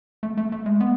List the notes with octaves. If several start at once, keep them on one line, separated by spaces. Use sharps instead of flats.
A3
A3
A3
G#3
B3